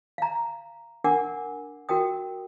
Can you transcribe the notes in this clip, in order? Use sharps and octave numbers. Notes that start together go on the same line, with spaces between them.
F5 A#5
D4 A#4 F#5 G#5 D6
F#4 A#4 G5 D#6